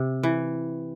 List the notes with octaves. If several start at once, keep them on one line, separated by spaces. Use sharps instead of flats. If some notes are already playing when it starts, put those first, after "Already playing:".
Already playing: C3
E3